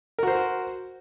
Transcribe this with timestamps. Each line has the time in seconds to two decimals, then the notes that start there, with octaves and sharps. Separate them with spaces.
0.19 A#4
0.23 F#4
0.27 C5